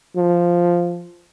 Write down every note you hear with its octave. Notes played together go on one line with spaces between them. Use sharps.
F3